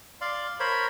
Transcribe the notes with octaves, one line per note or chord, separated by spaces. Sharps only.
D5 F5 C6
A#4 C5 C#5 B5